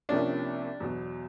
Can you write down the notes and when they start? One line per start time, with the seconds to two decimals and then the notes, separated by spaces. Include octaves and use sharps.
0.09 C2 C3 F3 A#3 C#4 D4
0.80 E2 B2 F#3